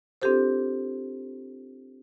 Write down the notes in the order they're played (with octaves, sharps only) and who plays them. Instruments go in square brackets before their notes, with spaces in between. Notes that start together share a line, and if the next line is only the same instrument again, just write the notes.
[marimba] C4 D4 F4 G4 A4 C5